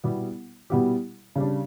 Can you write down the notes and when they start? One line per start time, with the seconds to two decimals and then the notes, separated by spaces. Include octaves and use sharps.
0.04 B2 G3 B3 E4 G4
0.70 B2 G3 B3 E4 G4
1.36 C#3 G3 D4